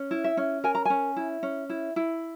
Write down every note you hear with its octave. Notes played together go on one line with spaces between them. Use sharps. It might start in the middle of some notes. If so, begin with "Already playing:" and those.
Already playing: C#4
E4
E5
C#4
A#4 G#5
A#5
C#4 G#5
E4
C#4
E4
E4